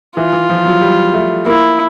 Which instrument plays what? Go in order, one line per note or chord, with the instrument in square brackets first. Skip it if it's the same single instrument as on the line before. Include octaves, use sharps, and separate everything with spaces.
[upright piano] E3 [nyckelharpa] F4
[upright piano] E3
F3
F#3
G3
A3
[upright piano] A#3 [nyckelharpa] E4